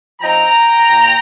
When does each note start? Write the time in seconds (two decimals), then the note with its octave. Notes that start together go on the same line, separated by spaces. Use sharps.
0.21 F3 C4 D#4 G5 A#5
0.90 A#2